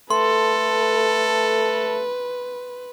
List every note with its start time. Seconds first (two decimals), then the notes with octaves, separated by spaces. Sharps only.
0.10 A3 A4 B4 C6